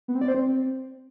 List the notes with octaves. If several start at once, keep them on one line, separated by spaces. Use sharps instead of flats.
B3
C4
D5
C5
C4